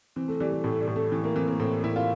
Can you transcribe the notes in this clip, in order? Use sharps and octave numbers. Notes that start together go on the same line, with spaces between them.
E3 C4
A3
E3 G3
A3
A2 A3
G3
A2
A3
E3
A#3
E3 C4
A#3
A2 C4
A2 E4
F4